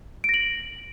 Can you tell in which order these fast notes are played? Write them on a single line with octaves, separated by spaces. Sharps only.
D7 A#6 F#7